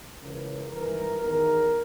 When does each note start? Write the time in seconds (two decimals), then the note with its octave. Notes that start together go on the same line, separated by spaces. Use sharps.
0.23 C#2 C#3 E3 A#4
0.71 G#1 G2 E3 A#4
1.21 E2 D#3 A#4